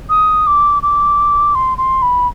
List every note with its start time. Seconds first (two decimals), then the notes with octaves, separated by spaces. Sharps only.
0.09 D#6
0.47 D6
0.82 D6
1.55 C6
1.78 C6
2.02 B5